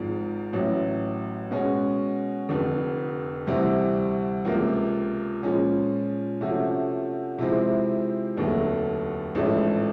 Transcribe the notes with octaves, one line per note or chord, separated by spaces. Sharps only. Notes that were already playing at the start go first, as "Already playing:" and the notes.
Already playing: G#1 G#2 F3
A1 A2 F#3
B2 G#3 C#4 F#4
F1 F2 D3
D2 C3 E3 G3 C4
C#2 C3 F3 A#3
A#2 F3 G#3 C#4
C3 F3 A3 C#4 F#4
C3 F3 G#3 C4 E4
F1 D#2 D3 F#3 A3
A1 G#2 F3 A3 D4